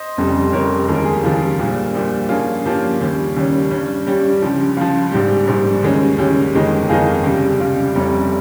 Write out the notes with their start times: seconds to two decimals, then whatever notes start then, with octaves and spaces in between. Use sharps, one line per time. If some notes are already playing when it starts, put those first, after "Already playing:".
Already playing: C5 D#5
0.17 F1 F2 C#3 G3 C4
0.52 F1 F2 C#3 G3 C4 A#4 C#5
0.88 D#2 C#3 F3 G#3
0.95 A#4
1.04 G#4
1.13 G4
1.23 D#2 C#3 F3 G#3 F4
1.59 A#1 A#2 G3 F4
1.94 A#1 A#2 G3 G4
2.29 G2 F3 A#3 C#4 F4 G#4
2.65 G2 F3 A#3 C#4 G4
3.00 D#2 C#3 G3 C#4 G4
3.36 D#2 C#3 G3 C#4
3.71 G2 G3 C#4
4.06 G2 G3 C#4 G4
4.42 C#2 C#3 F3 G4
4.77 C#2 C#3 F3 F4
5.12 A#1 G#2 G3 G4
5.47 A#1 G#2 G3 G4
5.83 D#2 C#3 G#3 C#4 G4
6.18 D#2 C#3 G#3 C#4 G4
6.54 G1 F2 D#3 G#3 D#4
6.89 G1 F2 D#3 G#3 D#4 F4 G#4
7.24 C#2 C3 G3 G4
7.60 C#2 C3 G3 F4
7.94 F1 F2 C3 G3 C#4 G4